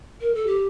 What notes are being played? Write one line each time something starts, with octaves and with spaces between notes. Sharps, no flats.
A#4
A4
G4